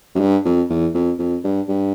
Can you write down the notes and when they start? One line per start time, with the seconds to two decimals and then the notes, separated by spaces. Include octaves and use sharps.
0.15 F#2
0.20 G2
0.45 F2
0.70 E2
0.94 F2
1.19 F2
1.44 G2
1.69 G2